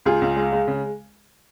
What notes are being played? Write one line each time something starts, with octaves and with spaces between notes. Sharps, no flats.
C#2 F4 G#4
C#2
G#3
G#3
C#3